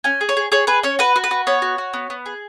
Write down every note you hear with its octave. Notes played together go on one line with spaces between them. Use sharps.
C#4 G#5
G#4
C#5
G#4
G#4 C#5
G#4 B4
C#4 C#5
F#4 B4
F#4
B4
F#4
B3 C#5
F#4
F#4
B3
B3
G#4